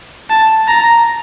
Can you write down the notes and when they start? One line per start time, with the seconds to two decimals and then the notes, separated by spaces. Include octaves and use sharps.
0.30 A5
0.68 A#5